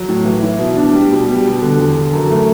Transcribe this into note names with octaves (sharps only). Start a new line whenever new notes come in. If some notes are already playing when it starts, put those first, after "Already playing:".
Already playing: F#3
A2
E3
E4
B2
D4
G3
B2
G3
B2
D3
E2
D3
F#2
A3